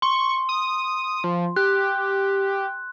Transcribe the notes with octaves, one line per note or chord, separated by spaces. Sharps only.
C6 C#6
D#6
F3
G4 F#6